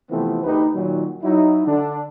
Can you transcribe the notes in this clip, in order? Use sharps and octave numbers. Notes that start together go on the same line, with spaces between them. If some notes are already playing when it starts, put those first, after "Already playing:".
C3 E3 F3 A3 B3 C4
D2 D#4 G4 B4
A#2 D#3 F#3
F#3 D#4 E4
D3 D4